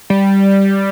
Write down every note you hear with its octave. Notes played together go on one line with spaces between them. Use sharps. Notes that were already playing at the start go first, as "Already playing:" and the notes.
G3